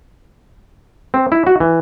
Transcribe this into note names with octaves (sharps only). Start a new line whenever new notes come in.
C4
E4
F#4
E3